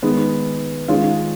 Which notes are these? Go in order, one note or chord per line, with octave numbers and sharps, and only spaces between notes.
D#3 G#3 B3
D#3 G#3 C#4 F4